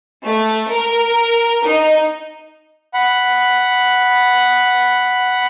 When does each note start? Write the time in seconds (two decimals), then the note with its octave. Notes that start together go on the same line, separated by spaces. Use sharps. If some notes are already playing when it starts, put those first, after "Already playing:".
0.23 A3
0.69 A#4
1.64 D#4
2.94 F#5 B5